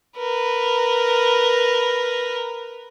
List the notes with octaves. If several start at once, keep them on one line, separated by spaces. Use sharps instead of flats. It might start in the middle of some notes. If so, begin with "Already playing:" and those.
A#4 B4